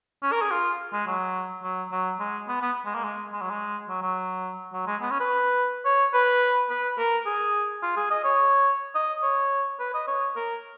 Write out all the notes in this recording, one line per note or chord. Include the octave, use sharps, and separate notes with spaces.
C#4
A#4
G#4
F4
G#3
F#3
F#3
F#3
G#3
B3
B3
G#3
A#3
G#3
G#3
F#3
G#3
F#3
F#3
F#3
G#3
B3
C#4
B4
C#5
B4
B4
A#4
G#4
F4
G#4
D#5
C#5
D#5
C#5
B4
D#5
C#5
A#4